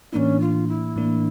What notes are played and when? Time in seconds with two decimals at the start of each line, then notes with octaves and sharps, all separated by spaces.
0.12 A2 E3 A#3 C#4 D4 E4
0.40 F4
0.68 E4
0.96 A2 E3 A#3 D4